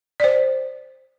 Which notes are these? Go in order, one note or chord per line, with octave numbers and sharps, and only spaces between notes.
C5 D5